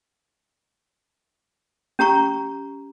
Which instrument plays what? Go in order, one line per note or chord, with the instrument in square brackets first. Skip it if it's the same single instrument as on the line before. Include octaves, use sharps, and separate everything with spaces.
[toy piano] C#4 G4 A#5 C#6